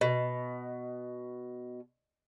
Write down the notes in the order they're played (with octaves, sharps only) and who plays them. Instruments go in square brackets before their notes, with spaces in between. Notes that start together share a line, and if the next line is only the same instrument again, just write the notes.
[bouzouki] B2 [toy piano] D#5